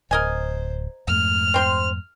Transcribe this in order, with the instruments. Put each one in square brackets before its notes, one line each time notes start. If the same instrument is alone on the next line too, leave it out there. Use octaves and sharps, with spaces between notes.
[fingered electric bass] D1 [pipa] A#4 D#5 G#5 [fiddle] C5
[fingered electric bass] F2 G#2 A3 [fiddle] F6
[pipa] C4 C5 C6